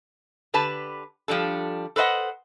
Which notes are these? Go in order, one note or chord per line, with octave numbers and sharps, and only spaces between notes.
D3 G4 B4 A5
F3 G3 D4 A4
A4 B4 C5 D#5 F#5